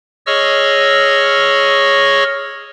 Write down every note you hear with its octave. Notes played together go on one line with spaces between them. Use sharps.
G#4 C#5 D#5 C#6 E6 F6